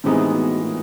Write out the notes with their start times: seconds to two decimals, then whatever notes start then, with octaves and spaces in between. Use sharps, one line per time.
0.04 A2 C3 E3 G#3 B3 D#4
0.34 B2
0.63 A#2